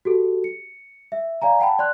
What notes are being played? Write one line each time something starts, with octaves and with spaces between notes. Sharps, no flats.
F#4 G4 A4
C#7
E5
D5 F5 G#5 A#5
F#5 G5 A5 B5
D5 C6 F#6